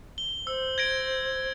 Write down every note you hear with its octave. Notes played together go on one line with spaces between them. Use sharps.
G7
C5 E6
G#6 A#6 D7